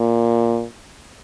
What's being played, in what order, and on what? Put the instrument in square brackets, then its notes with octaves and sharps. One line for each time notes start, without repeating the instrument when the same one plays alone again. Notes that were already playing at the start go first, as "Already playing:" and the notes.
Already playing: [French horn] A#2